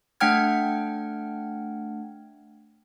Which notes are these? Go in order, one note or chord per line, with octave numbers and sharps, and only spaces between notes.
A3 D4 F#5 G5 F6 G#6